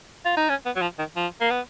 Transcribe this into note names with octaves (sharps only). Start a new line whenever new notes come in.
F4
D#4
C#4
B3
F#3
F3
D#3
F3
A#3
B3